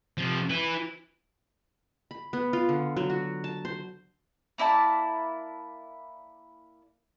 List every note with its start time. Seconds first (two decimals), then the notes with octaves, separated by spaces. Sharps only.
0.18 C3 F3
0.50 E4 B4
2.11 B5
2.33 B3
2.53 F4
2.69 D3
2.97 F#3
3.10 F#4
3.44 A5
3.65 C5
4.58 A#3 E4 D5 A5